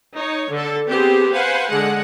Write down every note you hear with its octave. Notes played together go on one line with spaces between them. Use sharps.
D#4 C#5
D3 A4
B3 C4 G4 G#4 C5
B4 C5 F5 F#5 G#5
D3 G#3 F#5